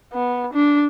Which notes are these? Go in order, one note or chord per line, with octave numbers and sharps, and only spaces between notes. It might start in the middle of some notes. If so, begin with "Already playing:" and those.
B3
D4